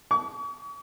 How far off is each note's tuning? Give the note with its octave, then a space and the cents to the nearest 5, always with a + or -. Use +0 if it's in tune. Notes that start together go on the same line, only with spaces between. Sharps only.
C#6 +40